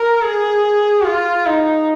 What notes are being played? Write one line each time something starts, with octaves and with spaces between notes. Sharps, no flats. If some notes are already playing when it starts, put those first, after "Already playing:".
Already playing: A#4
G#4
F4
D#4